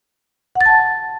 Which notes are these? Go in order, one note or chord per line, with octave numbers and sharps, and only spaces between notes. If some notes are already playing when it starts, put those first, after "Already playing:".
F#5
A6
A5